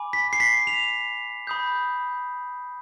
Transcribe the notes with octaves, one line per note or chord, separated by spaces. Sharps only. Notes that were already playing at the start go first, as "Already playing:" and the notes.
Already playing: G#5 B5 D6
B6
C7
B6
F7
B5 D#6 G6